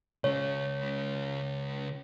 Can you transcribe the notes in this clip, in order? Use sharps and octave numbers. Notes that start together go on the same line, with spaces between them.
C#3 G#3 C#5